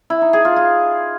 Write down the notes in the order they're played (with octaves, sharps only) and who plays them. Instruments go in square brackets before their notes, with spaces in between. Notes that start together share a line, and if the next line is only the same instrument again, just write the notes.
[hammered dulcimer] E4
D#4
G#4
F4
F4